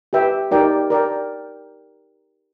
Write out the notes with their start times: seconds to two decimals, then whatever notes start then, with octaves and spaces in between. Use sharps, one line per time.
0.13 G4 B4 E5 G5
0.51 D#4 G4 A#4 D5 G5
0.90 A#4 D5 G5